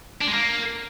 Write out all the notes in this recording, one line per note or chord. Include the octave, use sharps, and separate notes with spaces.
D4
G#3
A#3